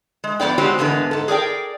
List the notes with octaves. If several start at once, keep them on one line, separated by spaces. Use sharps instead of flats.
G#3
F2 G3 B3 D5 G5
G#3 C4 F#4 G4 C#5 D5
E2 G#2 D3 A#3 B3
G#2 A4
G#4 A#4 D5 G5